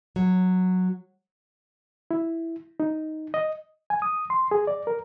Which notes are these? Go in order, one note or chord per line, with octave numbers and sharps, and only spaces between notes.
F#3
E4
D#4
D#5
G#5
D#6
C6
G#4
D5
A#4